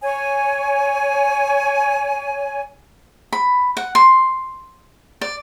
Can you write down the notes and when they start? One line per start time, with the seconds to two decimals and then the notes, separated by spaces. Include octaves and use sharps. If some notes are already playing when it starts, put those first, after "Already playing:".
0.03 C#5 G#5
3.33 B5
3.77 F#5
3.95 C6
5.21 D5